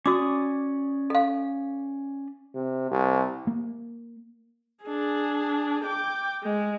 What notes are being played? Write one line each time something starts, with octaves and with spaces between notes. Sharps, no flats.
C#4 F#4 D5 D6 D#6
A4 F5
C3
C2
A#3
D4 G#4
G5 D6
G#3